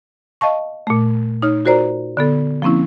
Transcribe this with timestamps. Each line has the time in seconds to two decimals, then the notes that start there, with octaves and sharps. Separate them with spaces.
0.41 D#5 F5 A5 C#6
0.87 A#2 A3
1.42 D#4 C#5 F6
1.65 F4 F#4 A#4 C5 D5 A#5
2.17 D3 B3 A4
2.62 F3 A#3 C4 C#4 E4